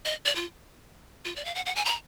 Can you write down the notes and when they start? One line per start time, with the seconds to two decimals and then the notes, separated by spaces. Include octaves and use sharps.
0.05 D#5
0.25 D5
0.35 F4
1.25 F4
1.36 D5
1.45 F5
1.55 F#5
1.66 F#5
1.76 G#5
1.85 A#5